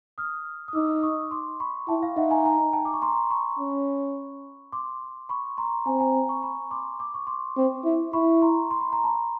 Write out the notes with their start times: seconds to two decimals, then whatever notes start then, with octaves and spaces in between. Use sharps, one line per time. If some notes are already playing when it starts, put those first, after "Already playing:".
0.18 D#6 F6
0.68 D#6
0.75 D#4 D6 E6
1.03 C#6 D#6
1.31 C6 D6
1.60 B5 C#6
1.88 E4 G5 A5
2.03 F5 G5
2.16 D#4 E5 F#5
2.31 G#5 A#5
2.45 G#5 A#5
2.73 G5 A5
2.85 D6
2.94 C#6
3.02 A#5 C6
3.30 B5 C#6
3.59 C#4
4.73 C6 D6
5.29 B5 C#6
5.58 A#5 C6
5.86 C4 G#5 A#5
6.00 G#5 A#5
6.29 B5 C#6
6.43 B5 C#6
6.71 C6 D6
7.00 D6
7.14 C#6
7.27 C6 D6
7.57 C4
7.84 E4
8.13 E4 B5 C#6
8.42 A#5 C6
8.71 C6
8.81 B5
8.93 A#5
9.04 A5 B5